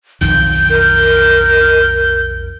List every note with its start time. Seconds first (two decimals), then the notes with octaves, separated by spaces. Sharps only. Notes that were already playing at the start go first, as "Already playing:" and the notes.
0.21 B1 F2 D#3 G6
0.70 A#4